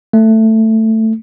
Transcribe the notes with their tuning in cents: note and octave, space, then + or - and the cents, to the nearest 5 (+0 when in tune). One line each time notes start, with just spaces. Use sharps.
A3 +10